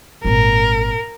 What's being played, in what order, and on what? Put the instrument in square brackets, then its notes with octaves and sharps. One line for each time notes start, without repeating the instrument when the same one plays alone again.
[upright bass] G#1 A#2 [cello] A#4